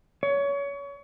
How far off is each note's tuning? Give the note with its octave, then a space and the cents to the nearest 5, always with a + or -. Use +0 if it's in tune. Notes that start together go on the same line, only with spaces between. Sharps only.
C#5 +25